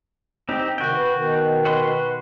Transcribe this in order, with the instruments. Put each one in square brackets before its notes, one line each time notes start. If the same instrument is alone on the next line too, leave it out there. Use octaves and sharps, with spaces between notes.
[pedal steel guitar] C4 D#4 G4
[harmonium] C3 D#3 [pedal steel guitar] F#4 G5
[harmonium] B4
B2 D#3
[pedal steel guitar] F#4 B4 C6